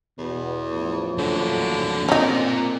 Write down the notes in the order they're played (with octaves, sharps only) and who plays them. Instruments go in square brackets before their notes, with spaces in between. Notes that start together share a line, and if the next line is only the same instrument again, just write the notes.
[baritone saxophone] E2 [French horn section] B2
[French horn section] F#2 A2 F3
[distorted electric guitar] D#2 F#3 [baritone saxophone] D3
[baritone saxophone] A#2 [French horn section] C4 [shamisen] C#4 D#4 [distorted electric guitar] A#4 D5